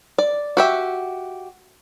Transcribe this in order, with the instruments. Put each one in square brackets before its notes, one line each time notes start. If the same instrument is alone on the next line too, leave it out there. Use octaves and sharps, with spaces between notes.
[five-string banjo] D5
F#4 G4 E5